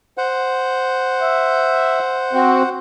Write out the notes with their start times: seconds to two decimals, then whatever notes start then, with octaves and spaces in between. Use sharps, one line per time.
0.18 C5 F#5
1.21 E5
2.33 C4 F#4